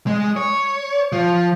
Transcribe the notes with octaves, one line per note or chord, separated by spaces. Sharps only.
G#3
C#5
F3